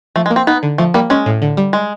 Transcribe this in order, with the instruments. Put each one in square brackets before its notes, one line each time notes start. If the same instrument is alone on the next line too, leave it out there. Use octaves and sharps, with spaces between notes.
[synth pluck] F3 [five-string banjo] A3
[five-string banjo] G#3
[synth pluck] A#3
[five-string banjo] C4
[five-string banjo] B3 [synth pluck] D#4
[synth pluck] D3
[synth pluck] F3 [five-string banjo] A3
[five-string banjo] G3 [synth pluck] A#3
[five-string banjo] G#3 [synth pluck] C#4
[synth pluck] A2
D3
G3
[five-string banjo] G#3